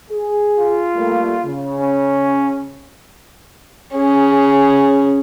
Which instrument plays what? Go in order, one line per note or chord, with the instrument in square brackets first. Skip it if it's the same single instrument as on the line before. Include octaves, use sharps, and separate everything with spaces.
[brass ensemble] G#4
[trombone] F4
[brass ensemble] G3 A3 A#3
C#3
[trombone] C#4
[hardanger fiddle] C#4 G#4